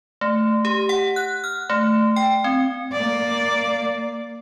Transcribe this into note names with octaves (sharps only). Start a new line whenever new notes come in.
A3
G4
F#5
F#6
F6
A3
G5
C4
A#3 D5